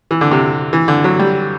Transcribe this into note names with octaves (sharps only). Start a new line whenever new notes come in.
E3
D3
C3
E3
D3
F#3
G3